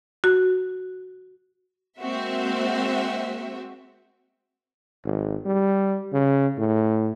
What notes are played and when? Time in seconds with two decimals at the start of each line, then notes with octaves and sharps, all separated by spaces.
0.24 F#4
1.99 G#3 A#3 C4 F#4 E5
5.05 G#1
5.46 G3
6.13 C#3
6.58 A2